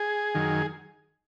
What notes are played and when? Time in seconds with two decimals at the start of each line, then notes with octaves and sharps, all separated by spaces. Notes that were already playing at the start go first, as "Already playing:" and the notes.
Already playing: G#4
0.35 F#2 D#3